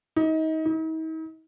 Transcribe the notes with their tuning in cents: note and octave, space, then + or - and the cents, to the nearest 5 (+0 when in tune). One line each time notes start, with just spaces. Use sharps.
D#4 +30
D#4 +45